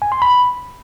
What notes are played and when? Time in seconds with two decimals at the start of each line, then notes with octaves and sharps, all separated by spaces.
0.02 G#5
0.12 C6
0.22 B5